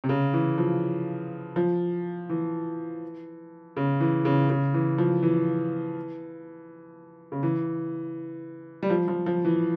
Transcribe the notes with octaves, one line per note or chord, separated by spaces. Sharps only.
C3
C#3
E3
F3
F3
E3
C#3
E3
C#3
C#3
E3
F3
E3
C#3
E3
G3
F3
F3
F3
E3